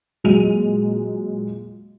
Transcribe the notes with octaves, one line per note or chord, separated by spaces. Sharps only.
A#2 F#3 G#3 D#7 F7